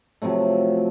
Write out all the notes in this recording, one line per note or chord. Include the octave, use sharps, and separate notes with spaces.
C3 F3 F#3 A3